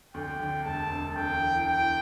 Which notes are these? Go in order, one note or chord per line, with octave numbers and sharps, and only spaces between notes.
D2 G5
D3
E1 A5
E1
D2 G5
E3
E3 G5